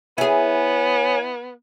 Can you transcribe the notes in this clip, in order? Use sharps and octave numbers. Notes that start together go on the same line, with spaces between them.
B3 E4 G#4 C#5 G#5